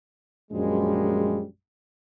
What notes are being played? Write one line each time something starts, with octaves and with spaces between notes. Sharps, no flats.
A#1 F#2 F3 G3 G#3